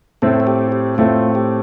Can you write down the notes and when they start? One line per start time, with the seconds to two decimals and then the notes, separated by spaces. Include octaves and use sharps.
0.22 A2 A3 C4 A4
0.40 A4
0.47 G4
0.72 G4
0.98 A2 A3 C4 F4
1.35 G4